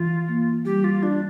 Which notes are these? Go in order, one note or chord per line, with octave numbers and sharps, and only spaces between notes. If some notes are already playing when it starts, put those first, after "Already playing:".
Already playing: E3 F4
A#3
G3 G4
F4
D4 F4